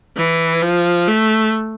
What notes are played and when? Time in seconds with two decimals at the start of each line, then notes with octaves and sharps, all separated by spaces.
0.16 E3
0.62 F3
1.07 A3